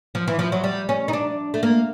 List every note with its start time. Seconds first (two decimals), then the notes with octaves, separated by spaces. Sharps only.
0.15 F3
0.28 E3
0.39 F3
0.52 F#3
0.64 G3
0.89 C#4
1.08 D#4
1.13 D4
1.54 A3
1.63 A#3